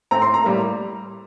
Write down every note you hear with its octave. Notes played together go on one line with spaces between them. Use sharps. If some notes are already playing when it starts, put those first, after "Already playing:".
A2 A3 C4 A#5
C6
A#5
A2 G3 A#3